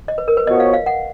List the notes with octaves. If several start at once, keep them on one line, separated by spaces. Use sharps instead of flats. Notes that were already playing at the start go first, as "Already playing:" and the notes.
D#5
B4
A#4
B4
F3 B3 F#4 C#5 D#5
F5
F5
F#5